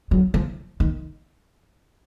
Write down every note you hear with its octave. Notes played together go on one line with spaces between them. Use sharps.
F#3
F3
D#3